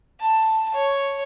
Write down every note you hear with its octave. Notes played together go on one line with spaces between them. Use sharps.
A5
C#5